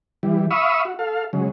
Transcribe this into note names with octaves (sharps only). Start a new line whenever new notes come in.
E3 G3
E5 F5 B5 C#6 D#6 E6
F#4
A4 F5
C#3 F#3 G#3